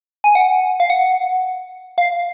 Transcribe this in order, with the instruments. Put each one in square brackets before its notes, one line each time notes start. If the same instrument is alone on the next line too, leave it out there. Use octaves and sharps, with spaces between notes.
[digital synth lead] G#5
F#5
F5
F#5
F5